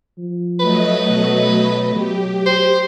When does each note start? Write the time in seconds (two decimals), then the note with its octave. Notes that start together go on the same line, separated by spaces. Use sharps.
0.18 F3
0.60 F#3 A3 B4 D#5
1.10 B2
1.96 F#3 G4
2.46 C5